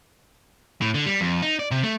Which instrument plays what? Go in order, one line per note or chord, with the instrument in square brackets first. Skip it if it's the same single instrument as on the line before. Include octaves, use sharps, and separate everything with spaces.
[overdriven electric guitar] A2
D3
G3
F2
D#4
D5
C3
A3